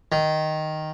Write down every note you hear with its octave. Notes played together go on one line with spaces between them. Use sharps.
D#3